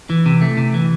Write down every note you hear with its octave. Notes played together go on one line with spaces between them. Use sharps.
E3
C3
A3
C3
E3